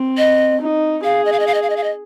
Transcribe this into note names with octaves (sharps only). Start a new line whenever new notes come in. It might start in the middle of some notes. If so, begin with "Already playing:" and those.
Already playing: C4
D#5
D#4
G#4 F5
D#5
F5
D#5
F5
D#5
F5
D#5
F5
D#5